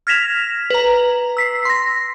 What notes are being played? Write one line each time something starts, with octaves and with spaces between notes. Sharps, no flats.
F6 G#6 A#6 B6 E7 F7
B4 A#5
E6 B6 C7
C6 A#6